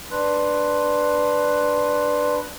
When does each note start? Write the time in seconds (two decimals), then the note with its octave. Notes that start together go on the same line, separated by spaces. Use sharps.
0.11 D4 B4 C6 F#6